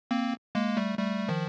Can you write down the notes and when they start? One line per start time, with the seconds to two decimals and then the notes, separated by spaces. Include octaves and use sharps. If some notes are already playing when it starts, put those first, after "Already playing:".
0.11 A#3 C4
0.55 G#3 A#3
0.77 G3 A3
0.98 G3 A3
1.28 D#3 F3